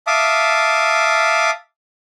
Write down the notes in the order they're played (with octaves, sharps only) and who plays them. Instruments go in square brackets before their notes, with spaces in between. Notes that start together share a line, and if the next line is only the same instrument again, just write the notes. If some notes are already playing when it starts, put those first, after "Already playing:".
[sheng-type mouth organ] E5 F5 A5 D6 D#6